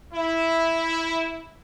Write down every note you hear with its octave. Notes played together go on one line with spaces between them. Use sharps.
E4